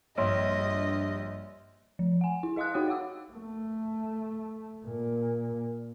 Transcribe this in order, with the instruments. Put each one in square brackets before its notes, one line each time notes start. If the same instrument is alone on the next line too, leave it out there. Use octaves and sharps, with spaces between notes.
[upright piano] A#1 [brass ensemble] G2 [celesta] C#5 C6 [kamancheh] D#5
[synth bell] F3
F#5 G#5
E4
G#4 D#5 F5 C6 D#6 F#6
D#4 F#4 C#5 F#5 G5 D#6
C#5 F#5 D6 E6
[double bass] A3
A#2